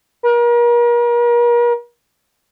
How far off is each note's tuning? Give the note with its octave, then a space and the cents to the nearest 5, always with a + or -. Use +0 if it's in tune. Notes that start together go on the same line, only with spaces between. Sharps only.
A#4 +40